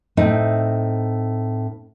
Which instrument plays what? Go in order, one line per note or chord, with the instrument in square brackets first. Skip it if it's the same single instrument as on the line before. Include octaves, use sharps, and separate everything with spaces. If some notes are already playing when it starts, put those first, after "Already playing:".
[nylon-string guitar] A2 C4 D#4